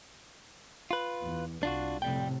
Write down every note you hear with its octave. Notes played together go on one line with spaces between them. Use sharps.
F4 B4
E2
C2 D4 F4 F#4
F2 A2 C3 G3 G5